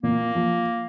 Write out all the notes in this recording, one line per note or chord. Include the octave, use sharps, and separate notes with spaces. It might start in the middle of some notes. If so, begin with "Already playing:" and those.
A#2 A#3
F3